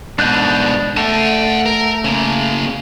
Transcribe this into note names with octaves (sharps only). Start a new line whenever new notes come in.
G#2 B2 D4 F#6 G6
A3 F#5 A5
A#4
C#3 A#3